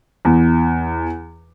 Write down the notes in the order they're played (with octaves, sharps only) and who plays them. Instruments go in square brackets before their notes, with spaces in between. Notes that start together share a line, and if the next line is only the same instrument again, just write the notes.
[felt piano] E2